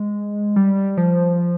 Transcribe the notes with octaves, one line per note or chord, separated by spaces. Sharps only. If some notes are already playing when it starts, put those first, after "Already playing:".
Already playing: G#3
G3
F3